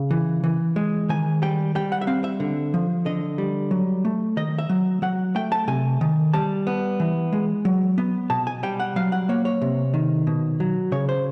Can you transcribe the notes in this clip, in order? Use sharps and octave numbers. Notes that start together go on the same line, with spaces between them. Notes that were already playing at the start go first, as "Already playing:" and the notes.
Already playing: C#3
E3
E3
G#3
D#3 G#5
G3 G5
G3 G5
F#5
E5
C4 F5
E5
D3
F3
D3 D#5
G3
F#3
A3
D#3 D#5
E5
F#3
F#3 F#5
A3 G5
A5
C3 G#5
D#3
G3 A5
B3
E3
G#3
F#3
B3
B2 A5
G#5
G3 G5
F#5
F#3 F5
F#5
A#3 C#5
C#5
C3
D#3
B2
F#3
C#3 C#5
C5